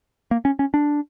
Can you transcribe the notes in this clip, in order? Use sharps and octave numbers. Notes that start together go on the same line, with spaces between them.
A#3
C#4
C#4
D4